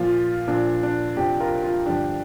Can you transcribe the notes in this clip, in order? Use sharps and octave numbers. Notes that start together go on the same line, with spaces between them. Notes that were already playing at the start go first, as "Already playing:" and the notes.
Already playing: A#2 F3 F4
A#2 F3 D4
D4
F2 C3 F3 D4 G4
F4 A#4
F4
G2 D3 F3 D4 G4